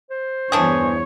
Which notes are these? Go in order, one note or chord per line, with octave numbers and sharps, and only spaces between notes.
C5
E2 G2 E3 D4 G#4 C#5